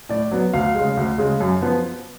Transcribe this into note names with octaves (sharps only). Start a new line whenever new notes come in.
A2 D5
F#3 B3
D2 F5
C#3 G#3
D2
C#3 G#3
F#2
F3 B3